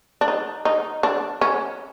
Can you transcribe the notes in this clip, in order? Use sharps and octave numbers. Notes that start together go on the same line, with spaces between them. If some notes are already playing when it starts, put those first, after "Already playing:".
D4
D#4
D#4
D4
C#4